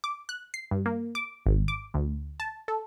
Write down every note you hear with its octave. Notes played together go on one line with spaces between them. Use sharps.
D6
F#6
C7
G2
A#3
D6
G#1
D6
D2
A5
A4